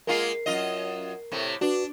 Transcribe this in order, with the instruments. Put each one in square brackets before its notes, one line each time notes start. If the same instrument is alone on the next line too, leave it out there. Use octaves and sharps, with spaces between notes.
[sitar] G#3 A#3 F4 [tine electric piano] A#4 C7
[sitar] F#2 F4 D#5
A2 C3 A3
[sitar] D4 [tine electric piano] F#4 B4